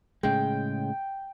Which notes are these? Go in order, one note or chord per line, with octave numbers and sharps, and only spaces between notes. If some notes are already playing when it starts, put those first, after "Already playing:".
A2 C#3 G#3 G5